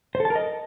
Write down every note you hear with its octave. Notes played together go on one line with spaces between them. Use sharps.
C5
A4
A5
A#4
D#5